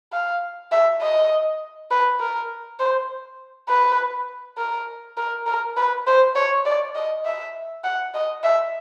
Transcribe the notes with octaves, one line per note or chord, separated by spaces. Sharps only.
F5
E5
D#5
B4
A#4
C5
B4
A#4
A#4
A#4
B4
C5
C#5
D5
D#5
E5
F#5
D#5
E5